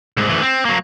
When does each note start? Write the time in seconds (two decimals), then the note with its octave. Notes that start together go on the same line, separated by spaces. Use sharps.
0.17 C2 G#2
0.29 D2 E3
0.42 C4
0.65 F#3 A#3